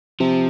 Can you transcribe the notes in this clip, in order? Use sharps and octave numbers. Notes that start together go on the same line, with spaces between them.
C3 F3